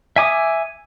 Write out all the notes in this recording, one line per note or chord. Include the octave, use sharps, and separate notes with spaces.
E5 G#5 D6 D#6